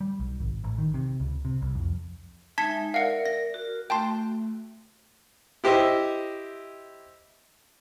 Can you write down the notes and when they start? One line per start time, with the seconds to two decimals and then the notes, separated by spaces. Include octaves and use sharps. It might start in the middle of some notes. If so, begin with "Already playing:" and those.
0.01 G3
0.20 B1
0.40 G#1
0.64 A1
0.78 D#3
0.94 C3
1.20 C#2
1.45 C3
1.62 C2
1.75 F2
2.58 G#3 D#4 E5 A5 G#6 B6
2.94 A#4 D5 F5 F#5
3.26 A#6
3.54 F#4 A#4
3.90 A3 G5 A5 C6
5.64 E4 G4 C5 D#5 E5